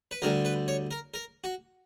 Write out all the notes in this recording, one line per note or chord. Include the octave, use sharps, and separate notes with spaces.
B4
D2 D3 G3 A#4
B4
C#5
A#4
A#4
F#4